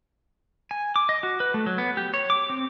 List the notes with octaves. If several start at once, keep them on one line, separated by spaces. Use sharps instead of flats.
G#5
D6
D#5
F#4
B4
A3
F#3
B3
G4
C#5
D6
C4